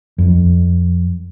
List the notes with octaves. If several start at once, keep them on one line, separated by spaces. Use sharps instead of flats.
F2